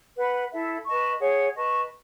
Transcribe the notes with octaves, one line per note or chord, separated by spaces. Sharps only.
B4 F#5 B5
E4 A4 E5
B4 D#5 A5 C#6
G#4 C#5 F#5
B4 D#5 A5 C#6